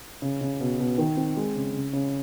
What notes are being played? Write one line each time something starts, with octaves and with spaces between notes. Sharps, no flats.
C#3
C#3
B2
B2
D#3
C4
G#3
C#3
C#3
C#3